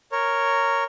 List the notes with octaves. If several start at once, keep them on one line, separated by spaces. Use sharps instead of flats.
A#4 C#5